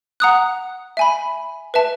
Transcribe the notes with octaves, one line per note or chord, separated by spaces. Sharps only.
F#5 A#5 D#6 F#6
E5 G#5 B5
B4 E5 A5